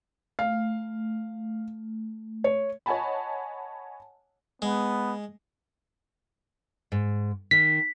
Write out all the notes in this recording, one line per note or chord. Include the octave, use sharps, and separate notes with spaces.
A3 F5
C#5
C#5 D#5 F#5 G#5 A5 B5
G#3 B3
G#2
D#3 B6